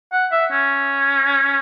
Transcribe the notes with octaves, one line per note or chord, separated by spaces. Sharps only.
F#5
E5
C#4